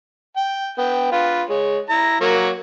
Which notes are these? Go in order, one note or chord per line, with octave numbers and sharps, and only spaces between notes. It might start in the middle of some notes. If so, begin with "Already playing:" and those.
G5
B3 G5
F4 B4
G#3 C#5
E4 A#5
F#3 A#3 C#6